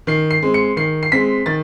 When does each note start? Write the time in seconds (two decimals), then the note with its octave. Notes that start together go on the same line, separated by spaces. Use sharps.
0.07 D#3 C7
0.31 C7
0.43 G#3 C4
0.54 C#7
0.77 D#3 C7
1.03 C7
1.12 G#3 C4 B6
1.46 D#3 A6